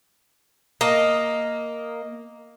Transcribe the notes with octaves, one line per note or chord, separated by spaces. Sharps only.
A#3 D#5